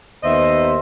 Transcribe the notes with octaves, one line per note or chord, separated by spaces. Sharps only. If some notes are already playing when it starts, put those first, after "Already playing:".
D#2 B3 C5 D#5 E5